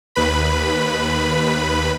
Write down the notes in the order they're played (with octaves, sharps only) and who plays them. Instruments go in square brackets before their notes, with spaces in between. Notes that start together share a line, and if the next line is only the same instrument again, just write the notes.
[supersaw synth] D#2 B4 B5